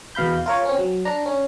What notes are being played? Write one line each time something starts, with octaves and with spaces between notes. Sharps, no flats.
E2 B2 F5 B5 G6
F4 A#4 C#5
C4 C#4
F#3
D4 A#5
C#4